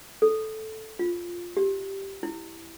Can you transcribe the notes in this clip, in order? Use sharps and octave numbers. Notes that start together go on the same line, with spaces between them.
A4
F4
G4
E4